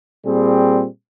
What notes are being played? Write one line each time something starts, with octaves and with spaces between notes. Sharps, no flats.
A#2 G3 C4 G#4